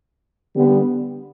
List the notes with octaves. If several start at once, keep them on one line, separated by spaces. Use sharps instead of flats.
D3 G3 B3